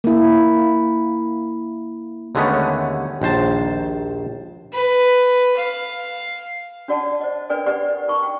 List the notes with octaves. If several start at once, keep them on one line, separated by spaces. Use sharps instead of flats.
A#3 E4
D#2 D3 G#3 A3 B3 C#4
A#1 D#2 C5 A5
B4
F5
D4 F#4 D5 F#5 A5
C5 D#5
D4 A#4 B4 D5 G5 G#5
G4 B4 D5 D#5 F#5
D#4 A#4 C#6
G5